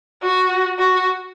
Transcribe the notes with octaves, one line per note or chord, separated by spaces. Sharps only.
F#4
F#4